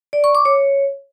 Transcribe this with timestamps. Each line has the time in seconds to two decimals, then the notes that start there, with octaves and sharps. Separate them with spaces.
0.13 D5
0.24 C#6
0.35 D6
0.45 C#5